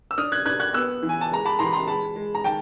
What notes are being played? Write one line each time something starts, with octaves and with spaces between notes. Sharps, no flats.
E6
D4 D#6 F6
F#6 G#6
D4 F#6 G#6
F#6 G#6
B3 E6 F#6
E3
G#5
A5
G#3 A#5
A5 B5
E3 A#5 C6
B5
A#5 C6
G#3 A5 B5
G#3
A#5
D#3 G5 A5